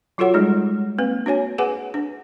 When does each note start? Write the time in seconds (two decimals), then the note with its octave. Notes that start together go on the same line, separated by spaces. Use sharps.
0.18 F#3 F4 F#4 A4 C#5 F#5
0.34 G3 G#3 D#4 G#4
0.98 A#3 C4 B4
1.26 D4 F#4 C#5 G#5
1.58 G#4 B4 F#5 G#5 D6
1.94 D4